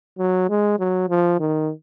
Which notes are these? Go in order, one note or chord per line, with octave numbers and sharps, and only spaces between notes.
F#3
G#3
F#3
F3
D#3